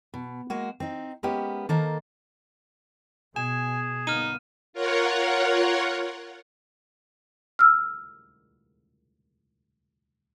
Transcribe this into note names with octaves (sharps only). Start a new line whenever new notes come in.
B2
G#3 A#3 F#4
C4 D#4
G#3 A#3 B3 C#4 G4
D#3 A#3 A4 C5 A#5
B2 G#4 G#5 E7
G1 A#3 B3 D#4 F6 D#7
F4 A#4 C#5 F#5
E6 F6